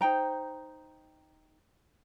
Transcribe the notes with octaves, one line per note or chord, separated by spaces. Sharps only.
D#4 C5 G5 A#5